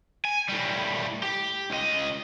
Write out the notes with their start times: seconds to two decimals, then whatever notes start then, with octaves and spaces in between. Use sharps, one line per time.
0.25 G#5
0.49 A2 G3
1.23 G4
1.70 C#2 D#5